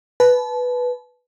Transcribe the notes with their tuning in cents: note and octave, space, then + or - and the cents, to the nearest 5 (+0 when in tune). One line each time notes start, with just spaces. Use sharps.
B4 +0 A5 -30